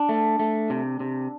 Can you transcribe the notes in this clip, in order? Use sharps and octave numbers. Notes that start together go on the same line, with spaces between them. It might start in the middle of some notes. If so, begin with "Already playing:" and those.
Already playing: D4
A3
A3
C3
C3